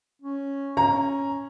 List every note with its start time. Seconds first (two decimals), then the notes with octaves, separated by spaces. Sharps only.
0.22 C#4
0.77 C#4 A#5